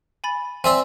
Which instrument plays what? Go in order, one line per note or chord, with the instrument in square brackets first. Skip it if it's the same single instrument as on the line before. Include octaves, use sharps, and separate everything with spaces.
[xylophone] G#5 B5 A6
[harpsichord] C4 E5 C6 [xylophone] D5 G#5